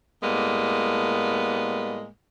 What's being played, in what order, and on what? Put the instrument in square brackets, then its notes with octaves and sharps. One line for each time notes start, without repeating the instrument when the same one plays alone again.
[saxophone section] A2 G3 G#3 A#3 B3